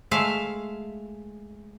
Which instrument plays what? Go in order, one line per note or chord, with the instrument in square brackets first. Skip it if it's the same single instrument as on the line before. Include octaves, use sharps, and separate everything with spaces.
[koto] G#3 A3 E5 F5